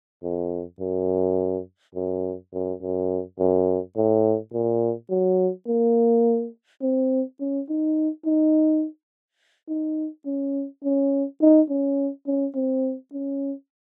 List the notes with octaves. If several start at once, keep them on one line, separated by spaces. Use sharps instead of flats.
F2
F#2
F#2
F#2
F#2
F#2
A2
A#2
F#3
A#3
C4
C#4
D#4
D#4
D#4
C#4
C#4
D#4
C#4
C#4
C4
C#4